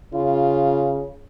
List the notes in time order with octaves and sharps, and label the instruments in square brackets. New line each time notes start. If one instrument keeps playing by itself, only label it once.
[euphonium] C#3 [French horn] F4